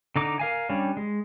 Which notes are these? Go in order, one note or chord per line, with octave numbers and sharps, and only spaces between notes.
D3 D#4 D6
A#4 F5 G#5
G3 C#4 D4
G#3